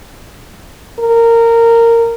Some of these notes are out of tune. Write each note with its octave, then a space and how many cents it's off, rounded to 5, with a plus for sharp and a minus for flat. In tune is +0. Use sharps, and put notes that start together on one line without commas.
A#4 -15